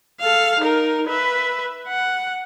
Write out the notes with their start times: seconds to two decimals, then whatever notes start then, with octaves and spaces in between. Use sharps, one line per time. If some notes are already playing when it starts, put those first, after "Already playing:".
0.21 A4 F5
0.60 D#4 A#4
1.07 B4 E5
1.87 F#5